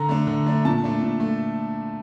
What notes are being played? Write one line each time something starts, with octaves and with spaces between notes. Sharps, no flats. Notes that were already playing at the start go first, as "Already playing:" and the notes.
Already playing: D3 A#5
A3 D4
D3
A3 D4
A#2 A5
A3 D4
A#2
A3